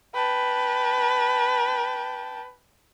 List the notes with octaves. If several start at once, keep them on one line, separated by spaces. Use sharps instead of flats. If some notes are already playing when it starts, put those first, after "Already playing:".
B4 G5 A5